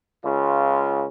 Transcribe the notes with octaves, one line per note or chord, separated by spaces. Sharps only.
C#2 C#3 F4